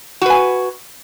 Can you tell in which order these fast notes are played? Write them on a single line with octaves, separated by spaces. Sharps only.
F#4 B4 G#5